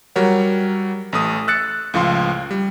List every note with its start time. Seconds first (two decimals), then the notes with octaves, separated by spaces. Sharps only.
0.16 F#3 G3 A#4 C#5 F#5
1.13 A1 A3 D#6
1.48 E6 F#6 A6 C#7
1.94 C#2 A2 F3 F5 C6
2.51 G3